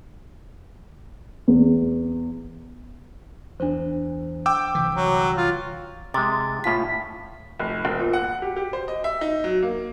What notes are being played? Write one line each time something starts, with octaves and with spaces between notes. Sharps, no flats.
E2
E2 D4 C5
G5 D6 E6
C2 D3 E3
F#3
F4
C3 G#3 D6 A6
A2 F4 G#5 B6
F1
E1
A#2
F#5
G4
G4
C5
D#5
E5
D#4
F#3
A#3